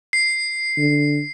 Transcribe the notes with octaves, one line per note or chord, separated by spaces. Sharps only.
C7
D3